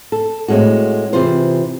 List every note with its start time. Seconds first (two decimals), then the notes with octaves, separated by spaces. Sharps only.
0.12 A4
0.48 A2 G#3 C4 F#4
1.13 C3 E3 F4 G#4 C5